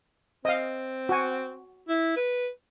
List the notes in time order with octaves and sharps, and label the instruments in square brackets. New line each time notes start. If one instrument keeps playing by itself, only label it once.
[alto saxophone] C4 [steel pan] D#5 F5
[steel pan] F#4 G#5
[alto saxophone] E4
B4